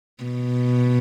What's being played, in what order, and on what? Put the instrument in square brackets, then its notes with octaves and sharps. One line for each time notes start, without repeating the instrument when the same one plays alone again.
[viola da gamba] B2